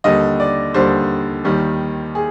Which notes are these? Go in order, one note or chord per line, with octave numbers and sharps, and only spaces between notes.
D#2 D3 G3 D#5
D5
D#2 D3 G3 C5
D#2 D#3 G3
G#4